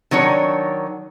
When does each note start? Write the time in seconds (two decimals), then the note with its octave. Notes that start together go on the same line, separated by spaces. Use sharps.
0.11 D#3 F#3 D4 C#5